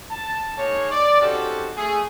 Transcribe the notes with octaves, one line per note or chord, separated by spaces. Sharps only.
A5
G#3 A#3 D#4 C#5
D5
C4 C#4 D#4 F#4 G4 A4
A3 G#4